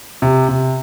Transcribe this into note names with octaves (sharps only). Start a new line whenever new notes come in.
C3
C3